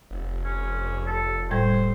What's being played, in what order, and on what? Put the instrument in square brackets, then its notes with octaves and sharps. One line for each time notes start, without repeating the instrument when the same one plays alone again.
[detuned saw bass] F1
[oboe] C#4
A4
[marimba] A2 G3 G#6 [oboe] C5